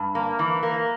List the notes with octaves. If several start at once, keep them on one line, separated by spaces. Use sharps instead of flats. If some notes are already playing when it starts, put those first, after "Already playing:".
Already playing: G2
A#3
E3
A#3